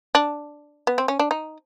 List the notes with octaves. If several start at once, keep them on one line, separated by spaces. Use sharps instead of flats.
D4
B3
C4
C#4
D4
D#4